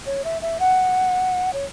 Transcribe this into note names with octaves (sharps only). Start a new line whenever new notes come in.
C#5
E5
E5
F#5
C#5